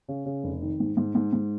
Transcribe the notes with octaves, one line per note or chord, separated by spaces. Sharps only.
C#3
C#3
F1
D#3
G#2
G#2
G#2
G#2